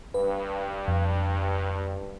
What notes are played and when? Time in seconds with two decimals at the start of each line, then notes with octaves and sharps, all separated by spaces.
0.14 G2 B4
0.88 F2